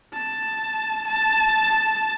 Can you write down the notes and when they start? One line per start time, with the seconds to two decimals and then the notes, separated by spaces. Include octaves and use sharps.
0.14 A5
1.08 A5